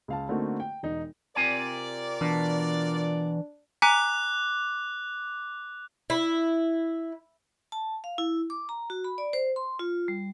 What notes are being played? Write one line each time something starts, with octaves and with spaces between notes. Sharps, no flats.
C#2 F5 A5
D3 A3 A#3 C4 D#4 F#4
G5
E1 D#4
C3 C4 F4 A#4 D5 G#5
B2 E3 D4
G#5 A#5 D6 F#6 B6
E4
A5
F5
E4
D6
A#5
F#4
B5
D5
C5
C6
F4
G3